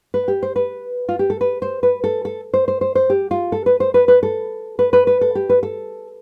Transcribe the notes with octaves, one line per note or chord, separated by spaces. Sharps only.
B4
G4
C5
B4
F4
G4
A4
B4
C5
B4
A4
A4
C5
C5
C5
C5
G4
F4
A4
B4
C5
B4
B4
A4
B4
B4
B4
A4
G4
B4
A4